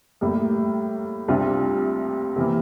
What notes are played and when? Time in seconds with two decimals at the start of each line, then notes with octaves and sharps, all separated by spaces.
0.21 A2 G3 A#3
1.28 C2 C3 G3 D4 F4
2.36 C3 E3 A#3